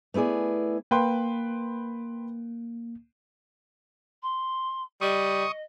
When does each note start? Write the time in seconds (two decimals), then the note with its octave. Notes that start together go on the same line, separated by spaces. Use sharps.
0.14 A3 B3 E4 G#4 D5
0.91 A#3 B4 G5 C6
4.22 C6
5.01 G3 D#5 C#6 D#6